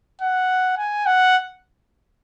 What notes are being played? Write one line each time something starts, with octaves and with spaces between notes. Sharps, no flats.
F#5
G#5
F#5